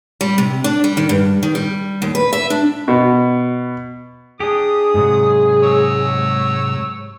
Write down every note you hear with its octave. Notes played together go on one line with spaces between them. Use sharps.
G3
C3
D4
G3
D#3
G2
D#3
G3
D#2
B4
E5
D4
B2
D4 G4 G#4 D#6
G#2 C3 F#3
C#5 E6